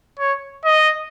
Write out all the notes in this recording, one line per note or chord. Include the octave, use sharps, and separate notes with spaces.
C#5
D#5